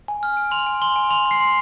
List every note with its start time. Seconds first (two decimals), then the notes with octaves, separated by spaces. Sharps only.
0.08 G#5
0.23 F6
0.37 G#5
0.51 C6 F7
0.66 G#5
0.82 C6 G7
0.96 G#5
1.11 C6 F7
1.26 C6
1.31 C7
1.40 C6